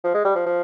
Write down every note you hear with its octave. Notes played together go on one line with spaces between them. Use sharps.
F3
G#3
G3
F3
F3